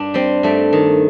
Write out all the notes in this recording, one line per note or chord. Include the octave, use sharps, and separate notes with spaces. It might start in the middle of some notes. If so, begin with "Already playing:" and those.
Already playing: G2 D4
G3 C4
G2 A3
D#3